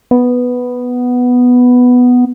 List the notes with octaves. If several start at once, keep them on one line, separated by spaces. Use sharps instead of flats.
B3